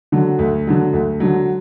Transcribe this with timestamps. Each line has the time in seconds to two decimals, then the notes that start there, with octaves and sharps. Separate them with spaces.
0.12 D3 F#3
0.39 D2
0.67 D3 F#3
0.93 D2
1.20 D3 F#3